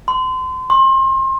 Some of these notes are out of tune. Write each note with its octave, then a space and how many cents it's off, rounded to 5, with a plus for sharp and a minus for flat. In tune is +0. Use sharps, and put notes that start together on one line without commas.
C6 -30
C6 +35